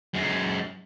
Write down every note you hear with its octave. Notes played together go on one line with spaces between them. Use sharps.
F#2 G#3